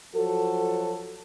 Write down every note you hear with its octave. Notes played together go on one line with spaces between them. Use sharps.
F3 F#3 F#4 A4